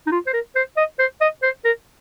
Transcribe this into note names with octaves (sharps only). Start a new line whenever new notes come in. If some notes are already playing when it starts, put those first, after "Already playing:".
D#4
F4
C5
A#4
C5
D#5
C5
D#5
C5
A#4